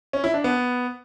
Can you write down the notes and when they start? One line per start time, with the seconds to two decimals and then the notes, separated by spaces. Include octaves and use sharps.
0.13 C#4
0.24 E4
0.34 D4
0.44 B3